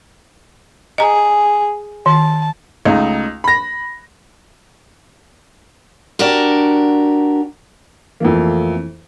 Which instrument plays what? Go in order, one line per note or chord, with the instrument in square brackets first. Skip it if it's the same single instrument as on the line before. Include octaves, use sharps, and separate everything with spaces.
[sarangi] G#4 [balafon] D#5 A#5
[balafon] D#3 [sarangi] A5
[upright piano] C#2 A3 D#4
B5 A#6
[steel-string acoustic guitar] D4 F#4 G4 A#4
[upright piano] F2 A3 A#3 [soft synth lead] E3